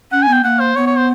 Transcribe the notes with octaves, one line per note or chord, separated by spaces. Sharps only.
C#4 F#5
G#5
B3 G5
A#3 F#5
C5
B3 C#5
C#5
C5